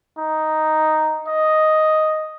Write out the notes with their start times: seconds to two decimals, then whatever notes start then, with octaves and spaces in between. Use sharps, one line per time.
0.19 D#4
1.28 D#5